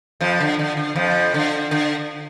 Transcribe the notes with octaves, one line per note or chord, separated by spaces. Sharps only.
F2 F3
D3
D3
D3
F2 F3
D3
D3